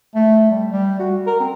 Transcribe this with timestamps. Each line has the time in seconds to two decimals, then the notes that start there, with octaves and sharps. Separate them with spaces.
0.15 A3
0.51 G3
0.73 G3
1.00 F#4
1.27 A#4
1.40 C4